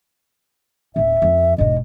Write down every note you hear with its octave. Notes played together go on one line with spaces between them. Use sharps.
D1 B3 E5
F2
E1 G#2 D#5